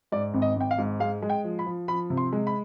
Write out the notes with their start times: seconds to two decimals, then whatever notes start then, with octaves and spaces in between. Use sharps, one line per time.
0.12 G#2 D5
0.34 G#1
0.42 D#5
0.56 G#1 G5
0.71 F5
0.78 G#2
1.00 G#3 F5
1.22 G#3
1.29 G5
1.44 F3
1.59 B5
1.66 F3
1.88 F3 B5
2.10 C3
2.17 C6
2.33 G#3
2.47 B5